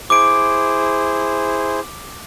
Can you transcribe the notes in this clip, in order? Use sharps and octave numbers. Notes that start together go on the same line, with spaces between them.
E4 G#4 C5 D6 D7